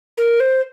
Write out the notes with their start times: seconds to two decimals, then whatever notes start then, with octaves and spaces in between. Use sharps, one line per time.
0.18 A#4
0.40 C5